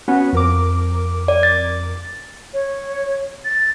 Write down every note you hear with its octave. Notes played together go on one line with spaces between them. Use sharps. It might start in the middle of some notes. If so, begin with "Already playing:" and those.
B3 C#4 F#4
F2 A#4 D6
D5
A6
C#5
A6